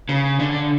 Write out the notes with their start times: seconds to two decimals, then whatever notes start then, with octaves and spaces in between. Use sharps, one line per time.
0.09 C#3
0.40 D3